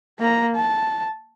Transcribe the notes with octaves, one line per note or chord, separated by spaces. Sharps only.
A#3 A#5
A5